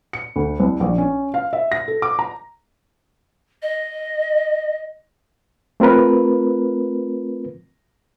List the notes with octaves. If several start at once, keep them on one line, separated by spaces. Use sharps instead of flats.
C#7
D2
C2
A#1
C#4
F5
E5
A#6
A4
D6
A#5
D#5
A3 C4 F4 A#4 B4